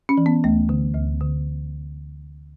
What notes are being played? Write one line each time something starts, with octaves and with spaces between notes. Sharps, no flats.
C#4
E3
B3
D2 A3
D3
D2
D3